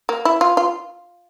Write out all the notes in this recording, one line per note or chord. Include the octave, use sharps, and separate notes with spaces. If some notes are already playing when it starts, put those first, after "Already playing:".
A#3
E4
F4
F4